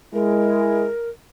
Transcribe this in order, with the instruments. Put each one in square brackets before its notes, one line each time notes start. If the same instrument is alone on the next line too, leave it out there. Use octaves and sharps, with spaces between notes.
[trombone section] G#3 E4 [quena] A#4